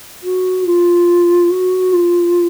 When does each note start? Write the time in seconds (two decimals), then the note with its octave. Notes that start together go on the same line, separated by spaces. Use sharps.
0.23 F#4
0.65 F4
1.50 F#4
1.92 F4